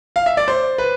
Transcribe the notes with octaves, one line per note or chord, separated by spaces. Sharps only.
F5
E5
D5
C5
B4